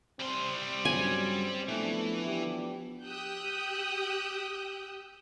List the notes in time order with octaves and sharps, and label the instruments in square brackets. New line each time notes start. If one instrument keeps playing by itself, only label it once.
[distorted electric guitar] G3 C6 [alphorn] C4
[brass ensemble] G2 C#3 F#3 [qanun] G#5
[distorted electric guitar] E3 [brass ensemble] F3 B3 D4 [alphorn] A3
[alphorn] G4
[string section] G4 G5 D#6 E6 F#6 G6